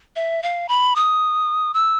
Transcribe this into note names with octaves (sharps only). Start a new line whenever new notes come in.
E5
F5
B5
D#6
E6